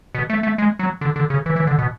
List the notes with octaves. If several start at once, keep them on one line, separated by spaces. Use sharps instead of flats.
B2
A3
A3
G#3
F#3
D3
D3
C#3
E3
E3
D3
B2